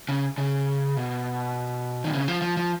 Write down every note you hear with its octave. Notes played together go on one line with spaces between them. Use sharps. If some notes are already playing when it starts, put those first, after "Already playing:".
C#3
C#3
B2
D#3
C#3
F3
F3
F3